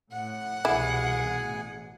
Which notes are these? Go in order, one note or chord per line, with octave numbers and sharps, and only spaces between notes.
A2 F#5
C2 B2 E3 E4 G#4 G#5
A1